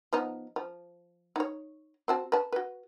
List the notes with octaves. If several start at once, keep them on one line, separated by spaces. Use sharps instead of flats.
F3 B3 D#4
F3
D#4 C#5
C4 F#4 A5
B4 A5
F#4 B4